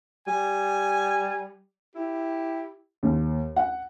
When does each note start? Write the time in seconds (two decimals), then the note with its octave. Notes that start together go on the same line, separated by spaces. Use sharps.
0.27 G3 G#5
1.96 E4 G4
3.03 D#2
3.56 F#5